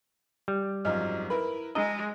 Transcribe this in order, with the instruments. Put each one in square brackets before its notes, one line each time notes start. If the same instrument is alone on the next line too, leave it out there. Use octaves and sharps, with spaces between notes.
[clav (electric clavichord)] G3
[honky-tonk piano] G#1 F#2 F3 [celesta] D#5 F6
[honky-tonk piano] E4 A#4 B4 [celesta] B5
[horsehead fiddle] G#3 [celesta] D4 E6 [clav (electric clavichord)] D#5 [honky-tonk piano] A#5